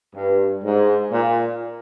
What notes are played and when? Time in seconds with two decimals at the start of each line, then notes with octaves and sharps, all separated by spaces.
0.15 G2
0.63 G#2
1.11 A#2